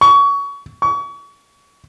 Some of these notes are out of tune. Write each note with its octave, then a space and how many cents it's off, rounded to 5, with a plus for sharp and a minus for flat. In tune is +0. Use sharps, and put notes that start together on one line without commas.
C#6 +25
C#6 +35